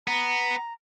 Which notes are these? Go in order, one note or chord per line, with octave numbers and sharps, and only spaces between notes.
B3 A#5